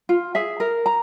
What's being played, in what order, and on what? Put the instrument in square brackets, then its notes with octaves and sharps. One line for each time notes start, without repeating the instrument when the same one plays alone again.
[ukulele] F4
G#4 E5
A#4
A#5